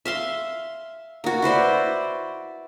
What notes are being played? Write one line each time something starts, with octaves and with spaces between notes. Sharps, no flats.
E5 F5 C6
A#3 F#4
E4 B4 C5 D5